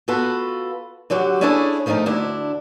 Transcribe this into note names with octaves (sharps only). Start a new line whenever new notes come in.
B3 F4 F#4 A4 B4
D3 F#3 F#4 G4
C#4 D4 E4 G#4 A4 C#5
D#3 F3 A3 D4 D#4
D2 D4 E4